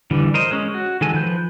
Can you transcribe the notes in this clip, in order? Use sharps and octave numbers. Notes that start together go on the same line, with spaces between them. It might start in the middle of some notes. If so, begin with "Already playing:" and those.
D3 E3 G3
A#4 C5 D#5
G#3 C#4
F#4
D#3 G#3 A4 G#5
F3 B4 G6